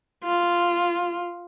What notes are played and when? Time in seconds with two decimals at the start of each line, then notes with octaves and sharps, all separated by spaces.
0.24 F4